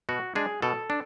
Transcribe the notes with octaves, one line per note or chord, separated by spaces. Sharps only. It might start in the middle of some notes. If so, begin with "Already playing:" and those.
B2 F#4
G#3 D4 G#4
B2 A4
D4